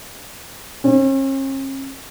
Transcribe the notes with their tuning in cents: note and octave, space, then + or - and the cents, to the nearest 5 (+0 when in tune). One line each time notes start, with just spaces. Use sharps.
C#4 -45